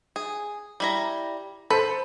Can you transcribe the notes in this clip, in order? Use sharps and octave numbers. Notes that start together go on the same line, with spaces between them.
G#4
G3 E4 A#5
A4 B4 C5